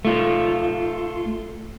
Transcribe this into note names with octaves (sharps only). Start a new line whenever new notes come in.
A3 F4